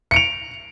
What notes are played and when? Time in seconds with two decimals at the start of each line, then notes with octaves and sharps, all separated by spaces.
0.11 C#7
0.14 D7
0.16 F7